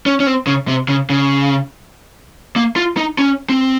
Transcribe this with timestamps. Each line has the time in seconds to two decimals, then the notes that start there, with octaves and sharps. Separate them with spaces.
0.06 C#4
0.20 C#4
0.27 C4
0.47 C#3
0.68 C3
0.88 C#3
1.10 C#3
2.56 A#3
2.76 F4
2.97 D#4
3.18 C#4
3.49 C4